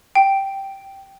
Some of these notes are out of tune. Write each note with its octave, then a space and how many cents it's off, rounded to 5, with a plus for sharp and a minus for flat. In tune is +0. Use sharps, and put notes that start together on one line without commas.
G5 -5